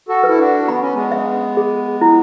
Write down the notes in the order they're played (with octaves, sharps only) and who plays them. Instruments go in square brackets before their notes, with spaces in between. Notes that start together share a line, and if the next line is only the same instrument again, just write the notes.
[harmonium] F#4 A4
[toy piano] B4
[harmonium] E4
D4 F#4
[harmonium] B3 [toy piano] B5
[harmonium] C#4
G#3 B3
[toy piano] E5
G#4
E4